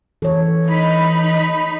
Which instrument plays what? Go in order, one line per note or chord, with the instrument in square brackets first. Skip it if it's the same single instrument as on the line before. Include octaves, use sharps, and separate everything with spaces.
[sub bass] E3 [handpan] A4 C#5
[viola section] D#4 B5